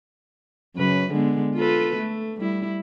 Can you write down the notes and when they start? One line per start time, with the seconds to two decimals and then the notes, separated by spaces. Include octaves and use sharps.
0.76 F#2 C#3 B4
1.11 D3 G#3 B3
1.55 F4 A4 B4
1.97 A3
2.40 G3 E4